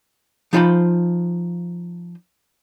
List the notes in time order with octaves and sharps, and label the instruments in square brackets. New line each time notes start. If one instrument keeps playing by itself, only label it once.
[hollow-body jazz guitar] F3 D#4 F4 C5 A5 B5